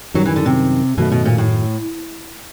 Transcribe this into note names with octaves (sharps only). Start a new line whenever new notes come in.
F#2 D#3 F#3 G3
E3
D3
C3
F#2 B2 D#3 F#3 A3
B2
A#2
A2